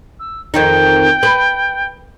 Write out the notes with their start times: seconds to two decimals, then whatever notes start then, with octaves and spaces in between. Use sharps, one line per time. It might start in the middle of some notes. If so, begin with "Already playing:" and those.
0.19 E6
0.54 F2 D#3 D#4 G5
1.23 B4